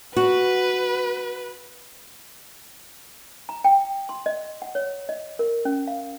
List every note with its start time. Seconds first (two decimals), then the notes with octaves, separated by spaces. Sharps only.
0.16 F#4 B4
3.49 A#5
3.64 G5
4.09 C6
4.26 D#5
4.62 F#5
4.75 C#5
5.09 D#5
5.39 A#4
5.65 C#4
5.87 F5